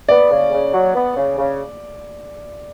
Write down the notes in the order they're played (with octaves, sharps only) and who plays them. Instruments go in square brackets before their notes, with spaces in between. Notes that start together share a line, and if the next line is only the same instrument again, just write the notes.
[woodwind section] B3 [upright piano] D5
[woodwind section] C#3
C#3
F#3
B3
C#3
C#3